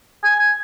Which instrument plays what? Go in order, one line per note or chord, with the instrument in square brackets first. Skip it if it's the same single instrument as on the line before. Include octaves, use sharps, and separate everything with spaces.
[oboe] G#5